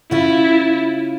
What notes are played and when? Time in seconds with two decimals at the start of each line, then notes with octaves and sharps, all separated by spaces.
0.11 C#3 E4 F4